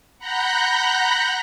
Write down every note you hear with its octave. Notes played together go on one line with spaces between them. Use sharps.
F#5 A#5 B5 F#6 G6 A#6